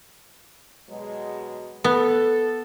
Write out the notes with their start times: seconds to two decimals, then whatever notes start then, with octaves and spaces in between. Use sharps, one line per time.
0.89 B2 F#3 G#3
1.84 B3 A4